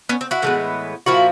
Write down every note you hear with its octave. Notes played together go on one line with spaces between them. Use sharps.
B3 C#4
C4
E4 F#4
A2 E3 G#3 B3
A#2 F3 A#3 E4 F#4